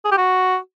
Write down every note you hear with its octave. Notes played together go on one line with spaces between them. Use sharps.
G#4
G4
F#4